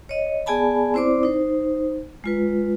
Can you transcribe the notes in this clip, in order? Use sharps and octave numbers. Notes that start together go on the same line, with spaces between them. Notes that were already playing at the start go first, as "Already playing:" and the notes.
C#5 D#5
B3 G#4 D5 G#5 A5 B5
C4 E4 C5 D5 D6
D#4 C5
G#3 F4 B4